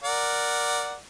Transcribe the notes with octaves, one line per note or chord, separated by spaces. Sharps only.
A#4 D5 F#5